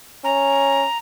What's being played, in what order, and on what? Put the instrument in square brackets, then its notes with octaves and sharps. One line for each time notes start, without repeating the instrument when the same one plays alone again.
[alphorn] C#4 [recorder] A#5